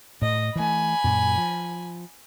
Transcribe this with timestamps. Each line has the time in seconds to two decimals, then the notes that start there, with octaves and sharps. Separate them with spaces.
0.22 A2 D#5
0.56 E3 A3 G#5 B5
1.04 F#2 A#2
1.38 F3